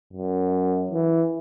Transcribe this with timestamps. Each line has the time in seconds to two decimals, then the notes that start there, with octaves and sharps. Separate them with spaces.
0.13 F#2
0.91 E3